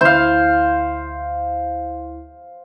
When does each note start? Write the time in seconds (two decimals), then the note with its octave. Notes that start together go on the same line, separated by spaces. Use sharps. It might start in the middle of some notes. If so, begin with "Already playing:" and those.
0.01 D2 E4 C5 F5